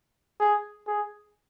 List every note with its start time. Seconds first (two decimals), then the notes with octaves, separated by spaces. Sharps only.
0.40 G#4
0.87 G#4